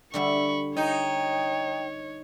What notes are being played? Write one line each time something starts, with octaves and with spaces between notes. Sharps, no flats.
D3 G3 E5 B5 C#6
D#4 C#5 G5